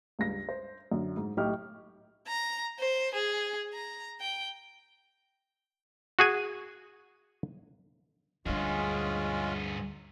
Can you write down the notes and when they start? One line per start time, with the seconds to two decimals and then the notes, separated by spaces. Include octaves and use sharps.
0.19 C#2 G2 A#6
0.49 C5
0.92 F#2 D3
1.17 G#2
1.37 B1 A2 D#4 G4 C#6 F6
2.28 A#5
2.79 C5
3.14 G#4
3.73 A#5
4.21 G5
6.19 F#4 G#4 G#5
8.46 D2 G2 G#3 C#4 D4 F4 G#4